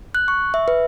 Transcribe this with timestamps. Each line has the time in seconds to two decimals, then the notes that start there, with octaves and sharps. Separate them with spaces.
0.15 F#6
0.28 C#6
0.54 E5
0.68 B4